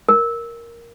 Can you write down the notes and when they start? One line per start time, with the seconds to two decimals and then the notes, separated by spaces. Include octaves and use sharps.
0.09 A#4